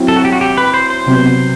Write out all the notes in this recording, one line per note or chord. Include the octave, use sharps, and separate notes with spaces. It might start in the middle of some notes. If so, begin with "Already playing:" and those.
Already playing: F#3 C4 E4
A4
F#4
G4
F#4
G4
B4
C5
C5
C3 F#3 B3